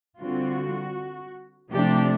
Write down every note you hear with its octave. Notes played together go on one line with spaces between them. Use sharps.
D3 G3 C4 F4 F#4
C3 F3 A3 D4 G4